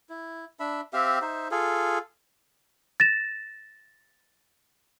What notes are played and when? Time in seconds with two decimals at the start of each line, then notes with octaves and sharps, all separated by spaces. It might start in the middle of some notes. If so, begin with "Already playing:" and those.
0.09 E4
0.60 D4 E5 B5
0.93 C4 G4 E5 F5
1.22 D#4 C5 E5
1.51 F4 G#4 A4
3.00 A6 A#6 E7